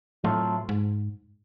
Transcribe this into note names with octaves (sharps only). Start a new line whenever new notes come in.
A2 F#3 A3 C4 F4
G#2